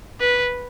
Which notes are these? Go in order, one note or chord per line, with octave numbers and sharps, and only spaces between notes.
B4